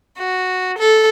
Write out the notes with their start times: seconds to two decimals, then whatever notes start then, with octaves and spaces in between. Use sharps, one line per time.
0.17 F#4
0.78 A4